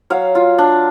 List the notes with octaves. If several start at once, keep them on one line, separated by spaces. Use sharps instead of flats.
F#3 F5
F4
D4